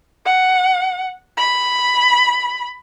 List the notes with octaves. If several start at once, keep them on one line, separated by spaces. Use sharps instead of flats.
F#5
B5